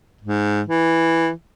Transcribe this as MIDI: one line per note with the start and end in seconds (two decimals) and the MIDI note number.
0.21 0.61 44
0.67 1.30 52